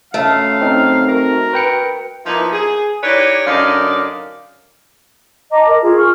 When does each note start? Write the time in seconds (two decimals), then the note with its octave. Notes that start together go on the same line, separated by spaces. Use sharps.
0.14 F#2 A3 F5
0.61 C4 D#4
1.08 F#4 A#4
1.53 B4 G5 C#7
2.25 F3 A#3 B3 D#4 E4
2.53 G#4
3.03 D#4 E4 G4 B4 C#5 D5
3.47 F#2 D3 D#4 D5 F5
5.52 D#5 A5 A#5 D6
5.68 A#4
5.82 F4 G#4
5.98 C#6 F6